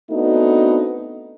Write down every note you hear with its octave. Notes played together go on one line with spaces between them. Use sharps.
A3 B3 C4 D4 D#4 F#4